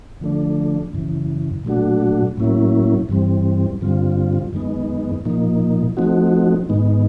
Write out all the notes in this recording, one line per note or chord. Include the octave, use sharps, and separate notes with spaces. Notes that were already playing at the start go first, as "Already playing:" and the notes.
D3 F3 A3 D4
F#2 C#3 E3
A#2 F#3 A3 D4 F#4
A2 F#3 A#3 C#4 E4
G2 E3 G3 C4
G2 D3 G3 C4 F4
F#2 D#3 G#3 B3 D#4
A#2 F3 A#3 D#4
F3 A3 C4 D#4 F#4
G#2 D#3 G#3 B3 D#4